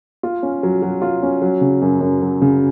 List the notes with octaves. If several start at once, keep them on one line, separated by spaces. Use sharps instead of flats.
F4
C#4
F#3
F#3
F4
C#4
F#3
C#3
F#2
F#2
F#3
C#3